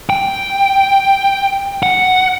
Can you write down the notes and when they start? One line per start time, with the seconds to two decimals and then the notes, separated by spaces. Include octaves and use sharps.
0.10 G5
1.83 F#5